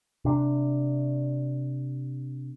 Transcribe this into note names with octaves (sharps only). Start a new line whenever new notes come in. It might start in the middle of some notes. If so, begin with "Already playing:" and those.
C3 D4